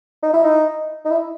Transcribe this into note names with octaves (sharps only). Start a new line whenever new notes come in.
D#4
E4
D#4
D#4
E4